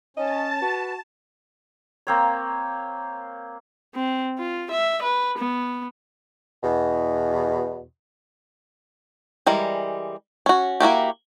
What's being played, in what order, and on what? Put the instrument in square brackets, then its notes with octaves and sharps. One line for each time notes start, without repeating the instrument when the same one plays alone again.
[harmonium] C#4 [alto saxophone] D#5 [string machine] A5
[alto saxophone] F#4 [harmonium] B4
[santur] A#3 C4 C#5
[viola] C4
F4
E5
B4
B3
[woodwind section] E2 B2
[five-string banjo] E3 G3 G#3 A#4
C#4 F#4
A#3 E4 F#4 G4